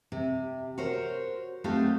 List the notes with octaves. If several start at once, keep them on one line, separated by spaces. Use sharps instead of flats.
C3
F#4 A#4 C5 C#5
F#3 A3 C4 D#4 F4 G4